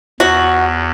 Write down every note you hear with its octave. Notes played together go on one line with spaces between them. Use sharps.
E2 F#4